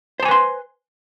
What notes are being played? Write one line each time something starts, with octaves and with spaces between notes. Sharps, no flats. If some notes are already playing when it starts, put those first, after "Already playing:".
B4 C5 G#5 A5 C6